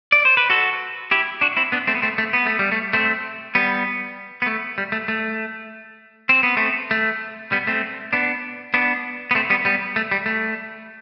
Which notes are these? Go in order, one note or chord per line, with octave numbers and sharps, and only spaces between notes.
D5
C5
B4
F#4 A4
E4 G4
D4 F#4
C4 E4
B3 D4
A3 C4
B3
A3 C4
A3
B3
A3
G3
A3
A3 C4
G3 B3
B3
A3
G3
A3
A3
C4
B3
A3 C4
A3
G3 B3
A3 C4
B3 D4
B3 D4
B3
A3 C4
G3 B3
G3 B3
A3
G3
A3